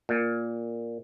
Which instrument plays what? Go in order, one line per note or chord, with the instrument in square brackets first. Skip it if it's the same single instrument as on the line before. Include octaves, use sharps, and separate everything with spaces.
[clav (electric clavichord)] A#2